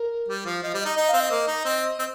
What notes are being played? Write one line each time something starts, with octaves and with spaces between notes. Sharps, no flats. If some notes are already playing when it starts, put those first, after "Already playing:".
Already playing: A#4
G3
F3
F3 D#5
G3
D#5
D#4
D#4 D#5
F5
C4
D#5
A#3
D#4
C4
C4